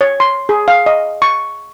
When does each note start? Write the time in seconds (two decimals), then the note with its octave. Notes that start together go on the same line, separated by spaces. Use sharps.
0.01 C#5
0.20 C6
0.49 G#4
0.68 F5
0.86 D#5
1.22 C#6